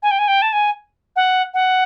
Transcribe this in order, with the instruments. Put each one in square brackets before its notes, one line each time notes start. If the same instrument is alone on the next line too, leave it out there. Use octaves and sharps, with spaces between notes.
[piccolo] G#5
G5
G#5
G5
A5
G#5
F#5
F#5